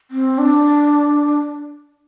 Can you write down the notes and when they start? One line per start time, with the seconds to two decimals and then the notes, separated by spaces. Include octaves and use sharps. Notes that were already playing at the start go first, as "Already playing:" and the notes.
0.11 C4
0.38 D4